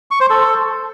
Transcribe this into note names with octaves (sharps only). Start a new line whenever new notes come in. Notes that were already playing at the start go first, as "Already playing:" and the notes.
C#6
C5
A4